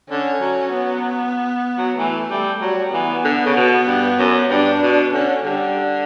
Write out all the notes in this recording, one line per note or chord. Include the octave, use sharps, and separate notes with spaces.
D3 C#4
F#3
B3
F#3
E3 A3
G3
F#3 G3
E3 B3
D3
C#3
B2
G2
F#2
G2 D4
B2
D3 C#4
D3 G3